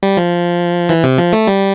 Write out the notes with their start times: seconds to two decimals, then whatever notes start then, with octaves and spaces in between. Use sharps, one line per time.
0.03 G3
0.17 F3
0.89 E3
1.04 C3
1.18 F3
1.33 A3
1.47 G3